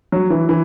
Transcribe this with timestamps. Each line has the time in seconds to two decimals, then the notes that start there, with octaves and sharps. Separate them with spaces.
0.12 F#3
0.30 E3
0.49 E3